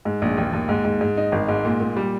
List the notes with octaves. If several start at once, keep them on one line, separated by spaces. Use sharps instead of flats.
G#2
A#1
D#2
D#2
G#2
G#2
G#2
D#4
G#1
G#2
A#2
A#2
G3